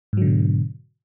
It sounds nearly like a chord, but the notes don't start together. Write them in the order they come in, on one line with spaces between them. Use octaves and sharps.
G#2 F#3 D3 B2